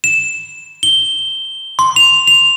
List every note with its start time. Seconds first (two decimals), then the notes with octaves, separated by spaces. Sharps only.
0.04 E7
0.83 G7
1.79 C6
1.96 F7
2.27 F7